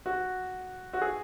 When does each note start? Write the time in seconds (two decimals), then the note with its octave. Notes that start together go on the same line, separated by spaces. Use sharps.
0.06 F#4
0.93 F#4
1.02 G#4